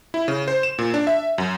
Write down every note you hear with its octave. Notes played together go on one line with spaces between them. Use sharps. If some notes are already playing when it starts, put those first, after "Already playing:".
E4
C#3
C5
E7
A#2
D4
E5
F#2